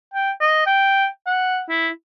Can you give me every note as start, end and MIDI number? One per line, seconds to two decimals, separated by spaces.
0.13 0.31 79
0.40 0.65 75
0.66 1.07 79
1.26 1.62 78
1.69 1.89 64